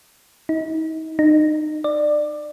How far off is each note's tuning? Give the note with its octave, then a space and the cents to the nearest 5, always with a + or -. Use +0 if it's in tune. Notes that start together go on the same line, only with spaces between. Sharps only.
D#4 +35
D#4 -30
D5 +20